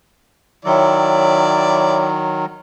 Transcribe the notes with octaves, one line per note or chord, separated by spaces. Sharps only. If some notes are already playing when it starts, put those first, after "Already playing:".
D#3 F#3 E4 C#5 D5 G5 E6